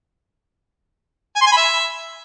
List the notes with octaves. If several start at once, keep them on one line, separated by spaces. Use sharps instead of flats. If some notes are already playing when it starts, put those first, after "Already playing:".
G#5
C6
G#5
B5
E5